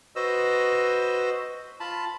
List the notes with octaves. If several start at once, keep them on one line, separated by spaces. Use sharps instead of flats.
F#4 B4 C5 D#5 E6
F4 A5 B5